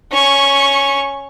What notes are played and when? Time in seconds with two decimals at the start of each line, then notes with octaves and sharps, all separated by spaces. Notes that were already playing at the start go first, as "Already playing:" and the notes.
0.11 C#4 C#6